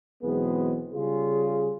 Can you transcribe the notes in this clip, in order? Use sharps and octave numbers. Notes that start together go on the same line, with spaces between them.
B1 E3 G#3 B3 C4 G#4
C#3 G3 F4 G#4